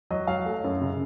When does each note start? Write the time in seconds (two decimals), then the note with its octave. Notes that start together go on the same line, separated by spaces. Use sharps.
0.11 F#3 D#5
0.27 F#3 F5
0.46 A3
0.64 F#2
0.81 C#3